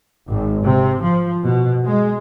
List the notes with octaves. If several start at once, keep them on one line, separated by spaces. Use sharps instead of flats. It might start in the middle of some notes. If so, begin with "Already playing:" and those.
G#1
C3
F3
B2
G#3